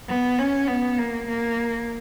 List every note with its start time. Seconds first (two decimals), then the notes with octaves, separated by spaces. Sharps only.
0.08 B3
0.38 C#4
0.68 B3
0.98 A#3
1.27 A#3